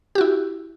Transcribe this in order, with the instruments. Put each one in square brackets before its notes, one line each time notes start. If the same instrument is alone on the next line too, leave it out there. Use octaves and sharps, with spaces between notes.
[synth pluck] G4
F#4
E4